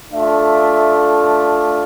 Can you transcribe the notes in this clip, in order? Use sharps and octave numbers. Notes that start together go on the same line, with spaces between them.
A3 D4 F4 E5